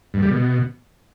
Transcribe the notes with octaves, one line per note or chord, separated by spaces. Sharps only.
G2
G3
B2